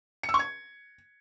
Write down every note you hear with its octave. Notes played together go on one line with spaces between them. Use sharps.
C#7
E6
C#6
G#6